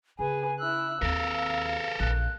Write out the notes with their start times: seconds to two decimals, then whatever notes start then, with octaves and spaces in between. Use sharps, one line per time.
0.19 C#3 G#4 B4 G#5
0.59 E4 E6 F#6
1.02 D#2 C4 A4 A#4 F5
2.00 A#1 F#6